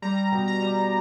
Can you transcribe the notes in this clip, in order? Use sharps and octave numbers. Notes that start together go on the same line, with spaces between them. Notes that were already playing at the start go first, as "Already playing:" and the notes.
G3 A#5
B2
A#5
G3